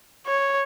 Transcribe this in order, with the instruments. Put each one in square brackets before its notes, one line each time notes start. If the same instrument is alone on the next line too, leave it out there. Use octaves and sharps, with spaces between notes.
[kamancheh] C#5